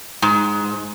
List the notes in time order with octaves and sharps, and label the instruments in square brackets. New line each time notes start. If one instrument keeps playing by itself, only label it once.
[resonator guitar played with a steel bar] G#2